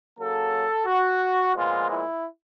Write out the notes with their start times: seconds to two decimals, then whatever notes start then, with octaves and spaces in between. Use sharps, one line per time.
0.19 C#3 F#3 A#3 A4
0.87 F#4
1.55 A#2 F3 G#3 B3 F4
1.89 E4